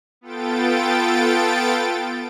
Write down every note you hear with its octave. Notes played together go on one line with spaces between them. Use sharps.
B3 F4 A4 G5 A6 D7